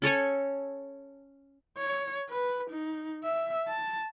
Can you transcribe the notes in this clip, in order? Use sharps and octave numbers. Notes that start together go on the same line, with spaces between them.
C#4 A4 C#5 G#5
C#5
B4
D#4
E5
A5